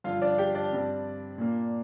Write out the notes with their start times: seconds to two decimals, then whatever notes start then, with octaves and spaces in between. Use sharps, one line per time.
0.04 G2 D3 F3 F4 F5
0.22 D4 D5
0.38 G4 G5
0.55 D4 D5
0.72 G2 G3 C4
1.38 A#2 A#3